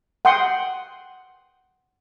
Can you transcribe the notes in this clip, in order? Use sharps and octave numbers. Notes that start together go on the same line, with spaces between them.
F#5 G5 C6 D#6